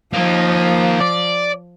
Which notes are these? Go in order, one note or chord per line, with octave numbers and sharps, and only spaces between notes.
F3 A#3 D#4
D5